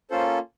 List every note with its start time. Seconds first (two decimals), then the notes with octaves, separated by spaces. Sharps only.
0.10 A#3 C#4 F4 A4 C5